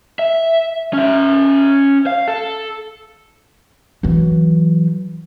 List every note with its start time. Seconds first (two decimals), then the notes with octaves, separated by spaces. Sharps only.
0.19 E5
0.93 C#4 E5
2.07 F5
2.28 A4
4.03 E3 F#3